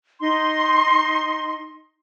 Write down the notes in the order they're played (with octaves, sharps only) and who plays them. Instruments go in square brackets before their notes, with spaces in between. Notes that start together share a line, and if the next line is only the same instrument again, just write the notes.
[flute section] D#4 C6